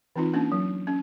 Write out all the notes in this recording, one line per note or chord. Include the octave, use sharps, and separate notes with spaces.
E3 C4 D#4 F4
A#3 C#4 D4
F#3
C#4